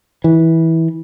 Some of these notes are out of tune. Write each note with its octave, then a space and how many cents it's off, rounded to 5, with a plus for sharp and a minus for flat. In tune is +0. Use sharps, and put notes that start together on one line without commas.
E3 -20